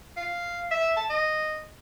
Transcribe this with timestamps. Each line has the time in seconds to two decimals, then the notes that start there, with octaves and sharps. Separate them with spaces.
0.16 F5
0.71 E5
0.96 A5
1.10 D#5